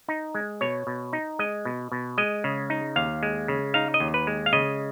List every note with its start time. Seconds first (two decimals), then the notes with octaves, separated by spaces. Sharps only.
0.08 D#4
0.35 G#3
0.61 B2 C#5
0.87 B2
1.13 D#4
1.39 G#3 D#5
1.65 B2
1.92 B2
2.18 G#3 D#5
2.44 C#3
2.70 D#4
2.96 D#2 F5
3.23 G#3
3.48 C#3
3.74 D#4 F5
3.94 D#5
4.00 D#2
4.14 B4
4.27 G#3
4.46 F5
4.53 C#3 D#5